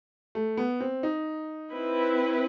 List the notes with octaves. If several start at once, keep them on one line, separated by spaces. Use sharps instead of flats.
A3
B3
C4
D#4
C4 E4 B4